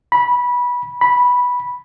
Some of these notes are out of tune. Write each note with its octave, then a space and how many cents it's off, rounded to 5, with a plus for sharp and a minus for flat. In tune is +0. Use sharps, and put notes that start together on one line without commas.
B5 -20
B5 -10